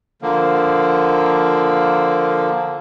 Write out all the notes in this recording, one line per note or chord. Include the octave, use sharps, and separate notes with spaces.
D3 F3 A#3